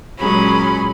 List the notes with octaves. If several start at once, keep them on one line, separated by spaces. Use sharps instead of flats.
A#2 F#3 G#3 C#4 B5